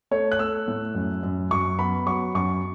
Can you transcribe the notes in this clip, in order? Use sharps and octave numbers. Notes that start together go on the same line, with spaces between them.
A3 C#5
F#6
A3 E6
A2
F#2
F#2
F#2 C#6
B3 B5
F#3 C#6
F#2 C#6